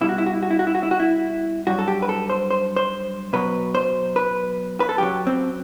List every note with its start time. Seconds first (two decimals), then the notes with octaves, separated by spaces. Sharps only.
0.01 B2 G3 E4
0.09 F#4
0.18 E4
0.26 F#4
0.34 E4
0.43 F#4
0.51 E4
0.59 F#4
0.67 E4
0.75 F#4
0.83 E4
0.91 F#4
1.00 E4
1.67 G2 F#3 F#4
1.79 A4
1.88 G4
2.02 B4
2.09 A4
2.30 C5
2.51 C5
2.76 C5
3.33 B2 F#3 B4
3.75 C5
4.16 B4
4.80 B4
4.89 A4
4.98 F#2 F#3 G4
5.27 C4